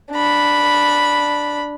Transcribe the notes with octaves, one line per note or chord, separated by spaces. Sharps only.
D4 B5